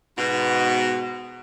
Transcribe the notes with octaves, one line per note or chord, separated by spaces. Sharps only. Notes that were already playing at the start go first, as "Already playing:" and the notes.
G#2 B2